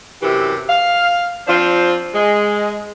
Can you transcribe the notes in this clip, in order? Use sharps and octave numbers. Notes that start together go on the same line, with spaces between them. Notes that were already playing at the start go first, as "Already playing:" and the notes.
F#2 C3 E3 G4
F5
F3 C4 D4 F4 C5
G#3